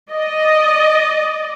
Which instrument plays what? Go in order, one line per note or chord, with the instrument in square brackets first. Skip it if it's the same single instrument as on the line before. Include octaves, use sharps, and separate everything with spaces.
[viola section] D5 D#5